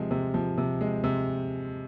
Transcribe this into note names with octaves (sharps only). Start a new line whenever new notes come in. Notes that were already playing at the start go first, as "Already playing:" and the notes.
Already playing: C3 F3 G#3
C3
F3
C3
G#3
C3